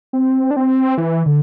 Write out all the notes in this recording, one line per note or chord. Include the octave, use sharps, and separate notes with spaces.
C4
D4
C4
E3
D3